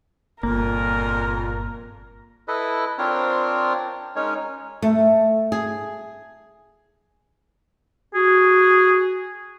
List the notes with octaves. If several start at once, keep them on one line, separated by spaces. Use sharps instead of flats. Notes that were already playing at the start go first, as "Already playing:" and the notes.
G1 F2 A#2 A#3 A#4
E4 A4 B4 D#5
C4 D4 F4 A#4 C5 C#5
G#3 C#4 D#4 A#4 C#5
A3
G#4
F#4 G#4